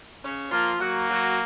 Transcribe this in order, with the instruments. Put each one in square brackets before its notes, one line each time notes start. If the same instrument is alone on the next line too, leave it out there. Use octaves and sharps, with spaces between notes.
[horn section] C#3 C#4
[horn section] F3 F4 [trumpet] A#3
[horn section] F#3 F#4 [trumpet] A#3
[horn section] F#3 F#4